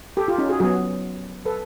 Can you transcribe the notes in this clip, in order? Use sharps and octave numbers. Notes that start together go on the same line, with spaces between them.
G4 A4
F4 G4
C#4 D#4
F#4 G#4
F#3 B3 F#4 G#4
A4 B4